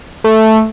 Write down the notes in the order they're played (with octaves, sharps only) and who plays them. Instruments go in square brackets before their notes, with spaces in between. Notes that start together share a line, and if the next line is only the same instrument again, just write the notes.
[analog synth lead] A3